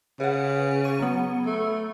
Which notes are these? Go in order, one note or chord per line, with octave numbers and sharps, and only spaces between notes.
C#3 B4 F#5
C#6 D#7
F#3 B3
A3